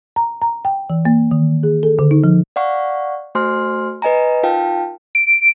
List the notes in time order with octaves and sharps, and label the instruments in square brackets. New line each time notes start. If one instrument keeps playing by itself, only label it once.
[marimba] A#5
A#5
G5
E3
A#3
D#3
G#4
A4
D3
D#4
F3
[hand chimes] D5 F5 F#5 C#6
A3 F#4 C5 G#5 C6 F6
B4 D#5 G#5 A#5
D#4 F4 A#4 F5 G5 A5
[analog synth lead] D7